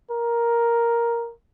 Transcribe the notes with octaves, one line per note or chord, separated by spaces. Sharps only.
A#4